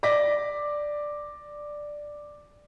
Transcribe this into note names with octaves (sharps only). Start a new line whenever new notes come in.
D5 D6 A#6 B6